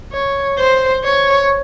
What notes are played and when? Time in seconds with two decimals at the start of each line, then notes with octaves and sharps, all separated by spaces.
0.12 C#5
0.58 C5
1.04 C#5